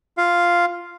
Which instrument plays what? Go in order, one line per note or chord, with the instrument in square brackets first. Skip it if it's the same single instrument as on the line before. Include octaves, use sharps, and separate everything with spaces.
[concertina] F4 F5